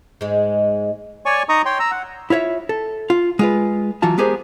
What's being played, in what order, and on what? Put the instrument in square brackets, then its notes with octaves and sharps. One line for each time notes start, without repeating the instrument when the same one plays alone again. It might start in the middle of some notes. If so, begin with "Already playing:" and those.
[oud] G#2 G#3
[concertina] C#5 D5 G#5 C#6
D#4 D#5 A#5 C#6 D#6
C#5 G5 C6
A#5 E6
F#5
[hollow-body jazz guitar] E4 F4 C#5 E5
A4
F4
G#3 F4 B4
E3 F#3 F4 A5
G#3 B3 G4 G#4 A#4 C5